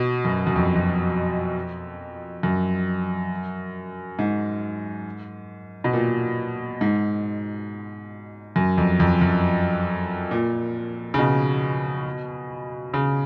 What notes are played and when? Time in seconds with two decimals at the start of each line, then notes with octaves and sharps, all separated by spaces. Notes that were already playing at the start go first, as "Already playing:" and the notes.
Already playing: B2
0.25 F#2
0.47 F#2
0.56 F2
0.75 F2
2.43 F#2
4.19 G#2
5.84 B2
5.93 A#2
6.81 G#2
8.56 F#2
8.78 F2
9.00 F2
9.22 F#2
10.31 A#2
11.14 C#3
11.18 B2
12.94 C#3